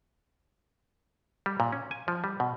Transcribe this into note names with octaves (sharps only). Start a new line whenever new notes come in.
G3
A#2
C#4
G#5
F3
G3
B2